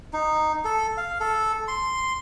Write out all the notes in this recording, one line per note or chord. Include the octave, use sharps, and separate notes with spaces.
D#4
A4
F5
A4
C6